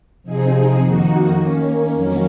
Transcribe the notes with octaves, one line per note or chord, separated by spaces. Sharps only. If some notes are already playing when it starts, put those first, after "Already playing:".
C3 F3 C4 D#4 G#4
F2 D#3 A#3 D#4 F#4
D#3 A#3 C#4
F2 D#3 F#3 A#3 C#4